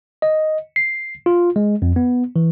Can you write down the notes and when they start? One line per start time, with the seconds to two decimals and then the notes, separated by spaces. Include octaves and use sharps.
0.22 D#5
0.76 C7
1.26 F4
1.56 G#3
1.82 F2
1.96 B3
2.36 E3